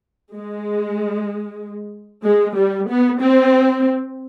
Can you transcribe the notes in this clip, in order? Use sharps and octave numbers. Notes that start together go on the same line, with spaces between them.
G#3
G#3
G3
B3
C4